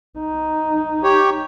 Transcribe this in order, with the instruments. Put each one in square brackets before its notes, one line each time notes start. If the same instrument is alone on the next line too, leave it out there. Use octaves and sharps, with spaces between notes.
[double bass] D#4
[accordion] G4 C#5